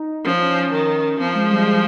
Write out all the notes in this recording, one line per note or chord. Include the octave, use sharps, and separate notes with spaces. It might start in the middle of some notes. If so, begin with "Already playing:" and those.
Already playing: D#4
F3 C#4
C#4
D#3
F3 C4
G#3
G3
G#3